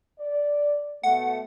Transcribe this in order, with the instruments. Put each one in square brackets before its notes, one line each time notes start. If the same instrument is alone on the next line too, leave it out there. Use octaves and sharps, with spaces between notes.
[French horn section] D5
[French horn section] B2 A3 [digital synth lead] F#5